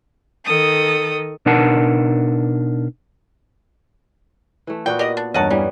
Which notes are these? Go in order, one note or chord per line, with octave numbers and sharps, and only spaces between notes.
D#3 A4 D#6
B2 D4 D#4 A#4 F#5 A5
E3 A3
A#2 B3 F#4 G5
G4 A#4 D5 D#5
D4
E2 G2 C#4 A#4 D#5 F#5 A5
E3 G3 B3 C#4